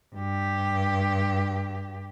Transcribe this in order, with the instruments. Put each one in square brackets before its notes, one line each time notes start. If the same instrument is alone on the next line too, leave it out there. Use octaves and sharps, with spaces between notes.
[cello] G2 G4